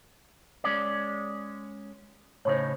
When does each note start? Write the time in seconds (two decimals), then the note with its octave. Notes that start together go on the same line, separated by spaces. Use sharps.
0.64 G#3 C#4 D5
2.45 A2 C#3 D#4 C5 C#5